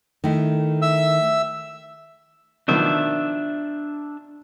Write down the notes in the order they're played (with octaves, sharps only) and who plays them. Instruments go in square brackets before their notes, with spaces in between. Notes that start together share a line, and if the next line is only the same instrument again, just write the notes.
[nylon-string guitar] D#3 A3 E4
[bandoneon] E5 E6
[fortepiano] B2 D#3 F3 [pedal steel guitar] D4 E5